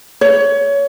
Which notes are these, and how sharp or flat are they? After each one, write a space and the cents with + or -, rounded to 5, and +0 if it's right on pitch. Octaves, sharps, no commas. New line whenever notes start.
C#5 +25